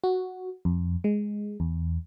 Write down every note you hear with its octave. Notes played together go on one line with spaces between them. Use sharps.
F#4
F2
G#3
E2